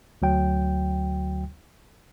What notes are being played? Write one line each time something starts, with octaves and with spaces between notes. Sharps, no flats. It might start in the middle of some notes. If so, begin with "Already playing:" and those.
D2 F#3 G5